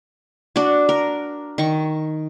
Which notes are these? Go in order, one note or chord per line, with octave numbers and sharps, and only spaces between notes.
D4 F#4
A#4
D#3 C#6